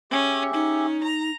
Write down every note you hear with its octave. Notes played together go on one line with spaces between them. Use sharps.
C#4 G4 G#4 E5
C#4 D#4
A#5